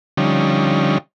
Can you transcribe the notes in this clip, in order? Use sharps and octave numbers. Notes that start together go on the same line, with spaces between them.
D3 F3 G3 C#4 D#4